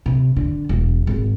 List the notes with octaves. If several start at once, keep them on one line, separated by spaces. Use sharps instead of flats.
C3
D3
E1
G#1